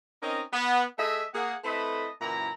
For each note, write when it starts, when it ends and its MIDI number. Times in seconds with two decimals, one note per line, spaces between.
0.22 0.41 60
0.22 0.41 61
0.22 0.41 63
0.22 0.41 70
0.22 0.41 75
0.52 0.82 59
0.98 1.23 57
0.98 1.23 68
0.98 1.23 75
0.98 1.23 76
1.33 1.54 58
1.33 1.54 68
1.33 1.54 78
1.64 2.07 57
1.64 2.07 60
1.64 2.07 64
1.64 2.07 69
1.64 2.07 71
1.64 2.07 75
2.20 2.49 42
2.20 2.49 46
2.20 2.49 52
2.20 2.49 64
2.20 2.49 82